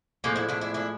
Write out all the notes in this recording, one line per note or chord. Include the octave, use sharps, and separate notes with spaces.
A2 F3 G#3 A#3 C4
D4 E4
D4 E4
D4 E4
D4 E4